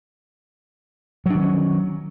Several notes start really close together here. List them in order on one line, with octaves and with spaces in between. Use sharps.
F#3 D4 D#3 C#4